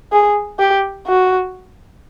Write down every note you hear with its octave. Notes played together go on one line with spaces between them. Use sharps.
G#4
G4
F#4